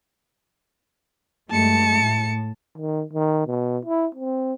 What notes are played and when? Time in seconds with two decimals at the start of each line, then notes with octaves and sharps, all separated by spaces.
1.51 G2 G#3 A3 A5 C#7
1.99 A2
2.78 D#3
3.13 D#3
3.47 B2
3.85 E4
4.15 C4